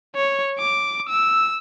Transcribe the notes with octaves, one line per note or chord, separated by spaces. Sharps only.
C#5
D6
E6